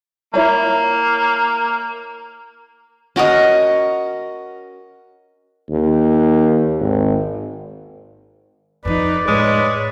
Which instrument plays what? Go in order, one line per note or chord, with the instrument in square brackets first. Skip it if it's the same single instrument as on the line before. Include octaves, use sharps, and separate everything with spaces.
[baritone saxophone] A#3 [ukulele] E4 C#5 A#5
[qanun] C#4 F#4 A#4 D#5
[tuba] D#2
G#1
[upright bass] F2 F3 [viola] D#4 B4 [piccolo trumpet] D5
[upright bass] A2 [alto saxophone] G#3 [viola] B4 C#5